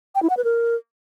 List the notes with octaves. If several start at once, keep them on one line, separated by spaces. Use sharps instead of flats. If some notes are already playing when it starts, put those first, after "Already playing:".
G5
E4
F#5
B4
A#4